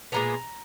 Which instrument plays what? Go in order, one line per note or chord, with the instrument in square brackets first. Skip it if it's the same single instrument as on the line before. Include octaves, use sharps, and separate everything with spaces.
[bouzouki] A#2 G#3 B3 A#5